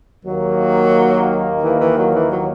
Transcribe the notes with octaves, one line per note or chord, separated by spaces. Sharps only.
D#2 D#3 F#3 A#3
E3
E3
F#3
E3
F#3